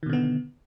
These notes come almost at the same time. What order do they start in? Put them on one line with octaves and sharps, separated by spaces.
D#3 B2 D3 B3